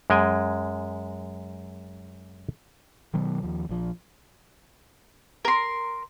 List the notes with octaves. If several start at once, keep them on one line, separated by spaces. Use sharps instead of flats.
F#2 G#3 G5 G#5
B2 D#3 F#3 B3
D#2 F3
A#1 F3
A#4 C6